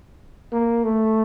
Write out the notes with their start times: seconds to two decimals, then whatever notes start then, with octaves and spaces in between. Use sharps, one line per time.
0.53 A#3
0.84 A3